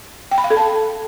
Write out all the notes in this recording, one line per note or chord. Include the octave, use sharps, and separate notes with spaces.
G5
B5
F5
A4
A5